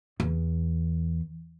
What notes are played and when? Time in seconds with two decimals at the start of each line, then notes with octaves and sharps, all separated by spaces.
0.20 E2